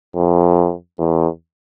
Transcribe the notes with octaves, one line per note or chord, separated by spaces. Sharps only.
F2
E2